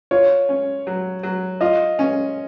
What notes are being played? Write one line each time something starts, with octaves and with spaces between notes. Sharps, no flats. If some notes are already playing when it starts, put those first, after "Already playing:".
F4 C#5
C#4
F#3
F#3
F4 D#5
C#4